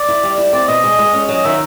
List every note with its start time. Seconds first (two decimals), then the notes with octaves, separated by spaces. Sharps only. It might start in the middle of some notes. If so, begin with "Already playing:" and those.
Already playing: D5
0.08 E4
0.23 G3
0.38 E4
0.53 C4 D5
0.68 B2 D#5
0.84 G#3
0.99 G#3
1.13 C#4
1.29 F#3
1.35 D#5
1.44 D#3 E5